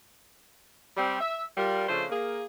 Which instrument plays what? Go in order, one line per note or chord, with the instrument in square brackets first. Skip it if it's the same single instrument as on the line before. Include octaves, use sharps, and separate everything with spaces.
[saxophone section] G3 C4
E5
G3 F4 A#4
C#3 F3 A3 D4 A4 C5
A#3 G#4